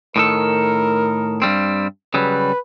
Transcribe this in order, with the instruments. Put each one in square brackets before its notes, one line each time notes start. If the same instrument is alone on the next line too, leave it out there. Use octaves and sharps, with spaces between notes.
[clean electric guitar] A2 D#3 A4 [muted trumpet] A#4
[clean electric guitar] G2 G3 C4
[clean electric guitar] C#3 F#3 G3 [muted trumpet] B4